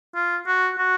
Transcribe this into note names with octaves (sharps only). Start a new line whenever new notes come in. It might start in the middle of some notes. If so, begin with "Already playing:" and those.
F4
F#4
F#4